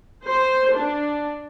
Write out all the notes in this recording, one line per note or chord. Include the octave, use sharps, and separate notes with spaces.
C5
D4